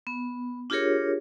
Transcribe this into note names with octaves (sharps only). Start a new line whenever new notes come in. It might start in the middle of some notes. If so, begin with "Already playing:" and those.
B3
D4 F4 G4 G#4 A#4 C#5